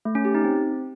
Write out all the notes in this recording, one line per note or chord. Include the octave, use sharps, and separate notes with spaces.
A3
C#4
G4
D#4
C4